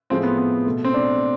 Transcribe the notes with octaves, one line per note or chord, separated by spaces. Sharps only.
A2 F3 G#3 C4
B3
B3
B2 A3
C4
D4